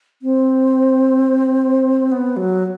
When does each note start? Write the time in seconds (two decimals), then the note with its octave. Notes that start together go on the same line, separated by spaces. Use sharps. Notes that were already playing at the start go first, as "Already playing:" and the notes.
0.22 C4
2.12 B3
2.37 F#3